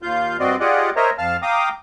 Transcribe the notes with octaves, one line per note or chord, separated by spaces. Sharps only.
D#2 F4 F5 G6
G2 C4 F#4 D5 D#5 C6
F4 G4 G#4 D5 D#5 F#5
A#4 C5 C#5 D#5 E5 A#5
F2 F5 A5 F6
F5 G5 A#5 D6 D#6